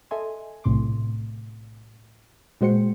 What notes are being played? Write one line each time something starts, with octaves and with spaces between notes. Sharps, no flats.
A4 D#5 E5 G#5 C6
B1 A2 C3 C6 D6
A#2 G#3 F#4 C5 G5 C#7